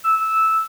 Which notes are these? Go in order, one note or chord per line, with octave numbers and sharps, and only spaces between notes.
E6